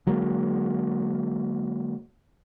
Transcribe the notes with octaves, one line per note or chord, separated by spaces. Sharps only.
D3 F#3 G#3 A#3